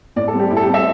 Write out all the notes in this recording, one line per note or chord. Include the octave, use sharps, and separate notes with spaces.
A2 D5
A4
G3 C4
G4
A2 E4
A4
G4
G3 C4
E5